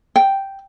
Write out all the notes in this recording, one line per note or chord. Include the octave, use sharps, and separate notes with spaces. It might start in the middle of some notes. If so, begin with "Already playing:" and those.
G5